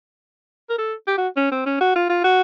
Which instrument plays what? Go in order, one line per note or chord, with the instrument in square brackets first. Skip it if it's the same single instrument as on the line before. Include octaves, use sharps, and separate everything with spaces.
[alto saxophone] A#4
A4
G4
F#4
C#4
C4
C#4
F#4
F4
F4
F#4